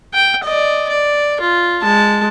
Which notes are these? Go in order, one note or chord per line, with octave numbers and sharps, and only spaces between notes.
G5
D5 D#5
D5
F4
G#3 A5